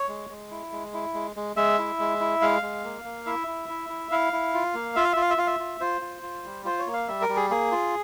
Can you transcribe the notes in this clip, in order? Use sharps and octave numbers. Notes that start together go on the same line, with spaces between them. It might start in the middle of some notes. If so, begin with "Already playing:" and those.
Already playing: C#5
G#3
G#3
E4
G#3
E4
G#3
G#3
G#3 E5
E4
G#3
E4
G#3 F5
G#3
A#3
A#3
E4 E5
E4
E4
E4
E4 F5
E4
F4
A#3
F4 E5
F5
F4 E5
F5
E5
F4 F5
E5
F4
F4 C5
F4
F4
G3
F4 C5
C#5
A#3
F5
G3 E5
A#4
G3
G#4
A#3 G#4
F4